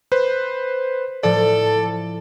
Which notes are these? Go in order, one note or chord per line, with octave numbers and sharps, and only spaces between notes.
B4 C5
A2 F3 A4 D5